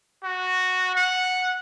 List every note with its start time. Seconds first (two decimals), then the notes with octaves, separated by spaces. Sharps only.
0.24 F#4
0.95 F#5